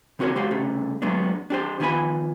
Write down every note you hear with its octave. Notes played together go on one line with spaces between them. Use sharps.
C#3 C4 F#4 A4 A#4 C#5
G#3 F#4 G4 C5 F5 F#5
C2 C#3 A3
F#3 G#3 A3 B3 D4
D4 G4 C5
D#3 F3 B3 C#4 G#5 B5